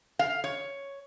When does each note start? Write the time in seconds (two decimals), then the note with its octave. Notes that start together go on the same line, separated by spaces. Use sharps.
0.19 F5
0.44 C#5